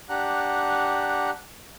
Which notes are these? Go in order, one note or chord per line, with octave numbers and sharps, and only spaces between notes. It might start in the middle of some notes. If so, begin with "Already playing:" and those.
D4 G4 F#5 A#5 F#6